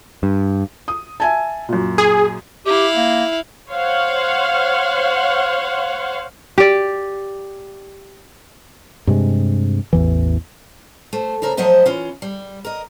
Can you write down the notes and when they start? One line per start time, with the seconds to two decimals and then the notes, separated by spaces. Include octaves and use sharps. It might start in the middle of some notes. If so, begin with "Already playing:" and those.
0.23 G2
0.88 D#6
1.20 E5 G#5 A5
1.69 F#2 A#2
1.98 G#4
2.66 E4 G4 F5
2.96 A#3
3.70 C5 C#5 F5 F#5
6.58 G4 D5
9.07 G2 C3 G#3
9.93 A1 E2 E3
11.13 A3 C5
11.42 C#3 A4 A#4 C5
11.57 F3 F#3 A3 C5 D#5 E5
11.86 E3 C#4 F4
12.22 G3
12.65 A#4 D#5